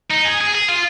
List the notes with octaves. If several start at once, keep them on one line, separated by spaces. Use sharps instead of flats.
D#4
G#4
G#4
G#4
F4